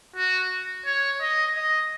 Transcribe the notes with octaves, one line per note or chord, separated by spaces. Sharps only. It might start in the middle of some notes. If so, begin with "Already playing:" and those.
F#4
C#5
D#5
D#5